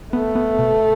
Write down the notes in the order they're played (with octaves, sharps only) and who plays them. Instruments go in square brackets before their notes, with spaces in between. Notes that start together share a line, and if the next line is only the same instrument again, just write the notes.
[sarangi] A3 [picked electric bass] B3
[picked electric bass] B3
B2